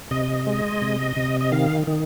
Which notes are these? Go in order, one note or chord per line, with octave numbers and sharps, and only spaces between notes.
C3 D#5
G#3
C3
C3
D#5
D#3 F5
D#3